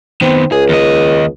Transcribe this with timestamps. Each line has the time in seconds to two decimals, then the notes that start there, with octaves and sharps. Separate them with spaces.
0.22 D#3 B3 C4
0.52 C#2 G#4
0.69 D#2 D#5